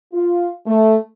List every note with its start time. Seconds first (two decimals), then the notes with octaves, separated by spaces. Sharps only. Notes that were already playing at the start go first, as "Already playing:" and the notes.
0.13 F4
0.66 A3